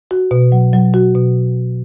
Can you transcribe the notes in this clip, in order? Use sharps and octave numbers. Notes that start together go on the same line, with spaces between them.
F#4
B2
F#3
F#3
F#4
B2